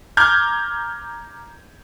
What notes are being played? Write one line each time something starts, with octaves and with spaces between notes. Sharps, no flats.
A#5 D6 F6 G6 G#6